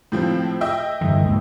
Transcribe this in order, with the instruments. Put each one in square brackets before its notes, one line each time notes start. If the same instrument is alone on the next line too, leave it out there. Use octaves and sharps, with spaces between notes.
[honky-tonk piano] A2 F3 C4
D#5 E5 G5
[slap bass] G2 D3 E3
D2 G#2 A#3